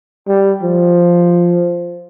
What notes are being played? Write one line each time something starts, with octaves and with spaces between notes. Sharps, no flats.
G3
F3